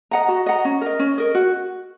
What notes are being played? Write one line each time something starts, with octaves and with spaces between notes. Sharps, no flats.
D#5 F#5 A#5
F#4
D#5 F#5 A#5
C#4
A#4 D#5
C#4
A#4 D#5
F#4